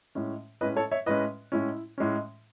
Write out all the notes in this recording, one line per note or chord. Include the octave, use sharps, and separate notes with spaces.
A2 G#3 C#4
A2 G#3 C#4 B4 D#5
A4 C#5
C#5 E5
A2 G#3 C#4 B4 D#5
A2 G#3 C#4 E4
A2 G#3 C#4